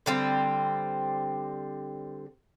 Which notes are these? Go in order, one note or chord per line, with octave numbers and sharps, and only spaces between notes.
D3 G3 C4